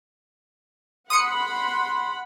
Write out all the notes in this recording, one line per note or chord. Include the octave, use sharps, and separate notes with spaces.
F#5 B5 C6 D#6 C#7